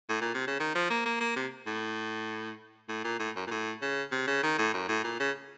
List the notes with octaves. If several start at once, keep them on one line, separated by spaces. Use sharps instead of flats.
A2
A#2
C3
C#3
D#3
F3
A#3
A#3
A#3
C3
A2
A2
A#2
A2
F#2
A#2
A2
C#3
C3
C#3
D#3
A2
F#2
A2
A#2
C#3